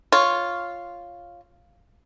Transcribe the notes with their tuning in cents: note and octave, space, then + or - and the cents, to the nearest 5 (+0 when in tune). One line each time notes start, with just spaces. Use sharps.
F4 +0 C#5 +0